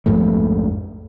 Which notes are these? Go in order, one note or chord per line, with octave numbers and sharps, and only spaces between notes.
A#1 F2 G#2 A3